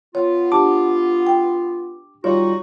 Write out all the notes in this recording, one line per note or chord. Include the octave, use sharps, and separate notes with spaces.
B3 F4 C#5
D4 G4 A5 D6
G5
G3 D#4 F4 F#4 C#5